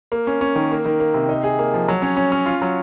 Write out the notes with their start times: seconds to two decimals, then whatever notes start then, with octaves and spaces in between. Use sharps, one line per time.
0.12 A#3
0.27 C#4
0.41 C#4
0.56 D#3
0.71 A#3
0.85 D#3
1.00 A#3
1.14 C3
1.29 D#4
1.44 G#4
1.59 A#3
1.74 F3
1.88 F#3
2.02 C#4
2.17 C#4
2.32 C#4
2.46 F4
2.62 F#3